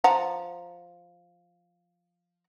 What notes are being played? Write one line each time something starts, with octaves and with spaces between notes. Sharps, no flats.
F3 F#5 A#5